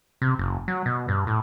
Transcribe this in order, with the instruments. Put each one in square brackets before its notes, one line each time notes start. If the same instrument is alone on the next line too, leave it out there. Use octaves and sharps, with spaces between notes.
[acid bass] C3
F#1
F#3
B2
G2
A2